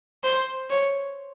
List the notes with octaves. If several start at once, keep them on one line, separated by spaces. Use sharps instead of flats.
C5
C#5